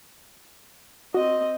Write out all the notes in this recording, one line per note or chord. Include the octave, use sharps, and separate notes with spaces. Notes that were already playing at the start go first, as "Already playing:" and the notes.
C4 F#4 D#5